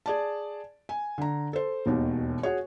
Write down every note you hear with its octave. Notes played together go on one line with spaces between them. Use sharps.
G#4 D5 A5
G#5
D3 A#5
A4 C5
E1 D#2 B2 D#3
F#4 G#4 C#5